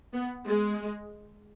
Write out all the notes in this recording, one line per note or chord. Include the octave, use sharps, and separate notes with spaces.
B3
G#3